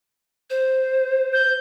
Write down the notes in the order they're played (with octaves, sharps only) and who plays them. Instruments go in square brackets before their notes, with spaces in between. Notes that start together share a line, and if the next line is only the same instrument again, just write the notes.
[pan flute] C5
[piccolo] G6